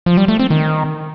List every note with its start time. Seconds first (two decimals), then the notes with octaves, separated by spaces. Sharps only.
0.06 F3
0.17 G3
0.28 A3
0.39 C4
0.50 D#3